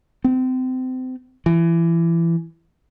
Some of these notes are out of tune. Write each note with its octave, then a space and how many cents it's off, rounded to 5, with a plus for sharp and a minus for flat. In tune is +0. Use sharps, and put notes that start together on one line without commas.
C4 -30
E3 +25